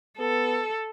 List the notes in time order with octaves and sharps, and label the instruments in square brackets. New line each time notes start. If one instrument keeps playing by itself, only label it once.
[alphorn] B3 [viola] A4